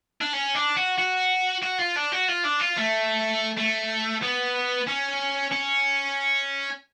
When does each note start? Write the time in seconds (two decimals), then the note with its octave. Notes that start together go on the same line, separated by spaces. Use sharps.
0.21 D4
0.33 C#4
0.55 D4
0.77 F#4
0.98 F#4
1.63 F#4
1.78 F4
1.96 D4
2.12 F#4
2.28 F4
2.44 D4
2.60 F4
2.77 A3
3.57 A3
4.22 B3
4.87 C#4
5.52 C#4